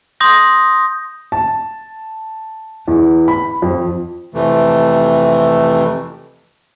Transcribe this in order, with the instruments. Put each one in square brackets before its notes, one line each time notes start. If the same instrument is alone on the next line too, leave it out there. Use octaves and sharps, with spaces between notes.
[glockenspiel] C6 D#6 G6 A#6
[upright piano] A5
E2
B5
F2
[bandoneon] F2 C3 E3 A3